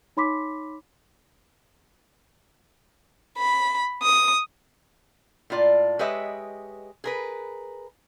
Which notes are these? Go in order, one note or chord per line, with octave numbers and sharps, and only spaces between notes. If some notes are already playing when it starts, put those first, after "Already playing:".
D#4 C#5 B5 C6 D6 B6
B5
D#6
A2 A#3 F4 D5
G#3 G4 B4 C#5 D#5 E5
G#4 A#4 B4